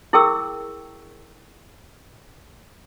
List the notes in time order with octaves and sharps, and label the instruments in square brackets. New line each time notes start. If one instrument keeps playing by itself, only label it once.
[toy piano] E4 G#4 A#4 G5 C#6 E6